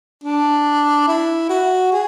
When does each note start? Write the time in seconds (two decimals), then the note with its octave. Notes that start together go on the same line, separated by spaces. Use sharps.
0.24 D4
1.08 E4
1.49 F#4
1.92 G#4